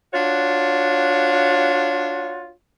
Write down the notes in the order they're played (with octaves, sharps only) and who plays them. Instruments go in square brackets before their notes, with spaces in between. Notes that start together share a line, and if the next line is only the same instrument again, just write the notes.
[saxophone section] D4 F4 F#4 C#5